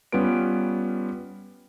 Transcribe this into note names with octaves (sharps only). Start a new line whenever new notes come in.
G3 B3 C#4 F4 B4 D7